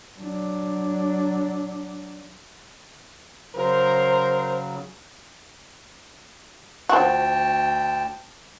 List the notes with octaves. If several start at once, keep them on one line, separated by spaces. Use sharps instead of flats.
F#3 D4
C#3 F#3 A#4 C5
D2 F3 F#4 G5 A5